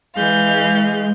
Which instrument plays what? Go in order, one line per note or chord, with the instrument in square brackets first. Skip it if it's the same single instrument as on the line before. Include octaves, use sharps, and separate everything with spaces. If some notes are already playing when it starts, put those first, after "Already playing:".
[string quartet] E3 F5 G6 [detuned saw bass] G#3